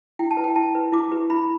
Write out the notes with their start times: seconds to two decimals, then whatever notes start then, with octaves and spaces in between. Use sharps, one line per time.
0.19 E4 G5
0.31 A5
0.37 B4
0.44 G5
0.56 E4 A5
0.75 B4
0.92 E4 D6
1.12 G4 B4
1.30 E4 B5